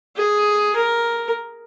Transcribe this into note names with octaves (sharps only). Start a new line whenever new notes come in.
G#4
A#4